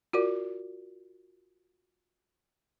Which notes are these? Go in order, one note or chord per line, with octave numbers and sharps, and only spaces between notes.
F4 F#4 A#4 D5